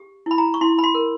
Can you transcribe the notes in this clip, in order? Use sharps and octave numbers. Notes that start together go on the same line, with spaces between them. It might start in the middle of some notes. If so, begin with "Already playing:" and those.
Already playing: G4
E4 B5
A#5
C#6
E4 C6
B5
C6
A#4